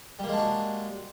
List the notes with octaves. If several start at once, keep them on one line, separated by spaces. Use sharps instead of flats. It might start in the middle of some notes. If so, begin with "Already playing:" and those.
G3 G#3 A#3 D4 F#4